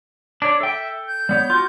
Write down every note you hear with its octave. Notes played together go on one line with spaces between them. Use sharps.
D4 C#5
A4 E5 G5
G6
G3 B3 C#5
F4 F#4